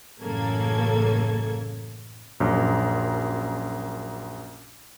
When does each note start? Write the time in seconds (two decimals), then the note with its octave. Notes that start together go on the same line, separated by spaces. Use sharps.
0.22 A1 F#2 C#3 A#3 A4 G#6
2.40 A#1 F#2